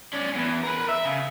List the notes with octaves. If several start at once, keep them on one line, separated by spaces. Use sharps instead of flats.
C#4 D5
E2 E3
A#4 B4
E5
C#3